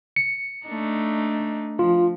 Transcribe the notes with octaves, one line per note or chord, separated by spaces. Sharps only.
C#7
A3 D4 D#4
F3 F4